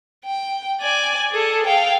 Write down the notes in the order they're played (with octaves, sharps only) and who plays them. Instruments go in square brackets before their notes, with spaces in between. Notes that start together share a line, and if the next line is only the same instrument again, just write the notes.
[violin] G5
D5 G#5
G#4 A4
F5 G5